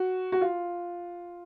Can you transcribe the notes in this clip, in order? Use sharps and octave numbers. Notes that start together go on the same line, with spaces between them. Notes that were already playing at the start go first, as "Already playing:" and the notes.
Already playing: F#4
F#4
F4